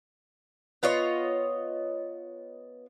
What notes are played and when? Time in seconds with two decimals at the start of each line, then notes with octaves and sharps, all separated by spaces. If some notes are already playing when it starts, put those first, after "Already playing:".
0.83 B3 F4 C#5 D#5